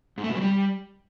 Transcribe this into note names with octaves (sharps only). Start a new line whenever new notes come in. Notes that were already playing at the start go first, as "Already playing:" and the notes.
G#2
A3
B2
F#3
G3